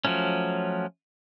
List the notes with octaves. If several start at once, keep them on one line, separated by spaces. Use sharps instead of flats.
F3 F#3 A3 C#4